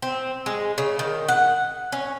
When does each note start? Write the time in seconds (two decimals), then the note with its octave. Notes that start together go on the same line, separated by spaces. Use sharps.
0.02 C4
0.46 G#3
0.78 C#3
0.99 D#3
1.28 F#5
1.92 C#4